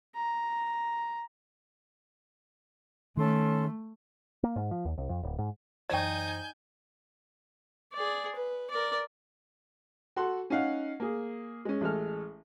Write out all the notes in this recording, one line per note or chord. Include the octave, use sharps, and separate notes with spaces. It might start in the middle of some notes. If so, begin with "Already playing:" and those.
A#5
D#3 A3 C#4 A4 C6
A#3
G#2
F3
D#2
C2
F2
D1
G#2
F#2 E3 D#4 C5 D5 G5 G#5 G6
G#4 D5
B4
A#4 D5
F#4 A4 F#5 C6
C#4 D#4 F5 F#5
A#3 G#4
G#3 C#4
A1 G#3 A4 F6